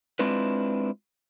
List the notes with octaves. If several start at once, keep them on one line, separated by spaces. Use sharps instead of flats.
G#3 C4 D4 E4 F4 B4